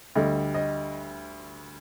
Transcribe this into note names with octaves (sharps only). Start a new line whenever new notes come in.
D2 D3 G3 D#5
D#5